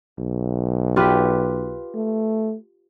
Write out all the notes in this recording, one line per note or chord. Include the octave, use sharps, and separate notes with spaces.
B1
F4 G4 B4
A3